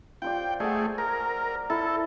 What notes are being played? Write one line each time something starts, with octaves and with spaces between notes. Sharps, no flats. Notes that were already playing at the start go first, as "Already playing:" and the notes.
F4 C5 D5 G5
A3 G#4 D5 F#5
A#4
E4 A4